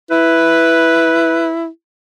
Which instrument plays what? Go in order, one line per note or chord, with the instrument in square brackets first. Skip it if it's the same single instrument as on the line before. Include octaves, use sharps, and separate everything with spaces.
[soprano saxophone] E4 [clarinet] B4